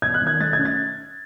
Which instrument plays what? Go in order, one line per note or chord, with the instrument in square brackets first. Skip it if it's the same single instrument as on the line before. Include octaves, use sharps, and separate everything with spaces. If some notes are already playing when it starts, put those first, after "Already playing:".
[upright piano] E2 G#6
F#6
D#3
G#6
A3 A6
G#6
C#4
A6